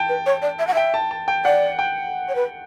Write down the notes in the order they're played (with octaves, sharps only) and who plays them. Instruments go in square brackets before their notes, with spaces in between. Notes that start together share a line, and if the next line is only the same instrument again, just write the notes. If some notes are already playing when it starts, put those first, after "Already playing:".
Already playing: [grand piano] G5 A5
[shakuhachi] B4
C#5
D5
E5
F#5
[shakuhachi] E5 [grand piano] G5
[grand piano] A5
A5
G5
[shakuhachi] D5 [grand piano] F#5
[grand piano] G5
[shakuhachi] C#5
B4